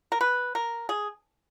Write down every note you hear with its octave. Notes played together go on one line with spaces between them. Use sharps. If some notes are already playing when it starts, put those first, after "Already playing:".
A#4
B4
A#4
G#4